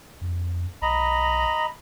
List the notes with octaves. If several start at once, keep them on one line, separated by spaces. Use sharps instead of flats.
F2
B1 D#5 A#5 B5